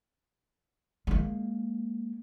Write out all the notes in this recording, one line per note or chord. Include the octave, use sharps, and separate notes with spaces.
G#3 A#3